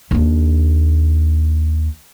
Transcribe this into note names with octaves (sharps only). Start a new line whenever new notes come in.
D#2 D4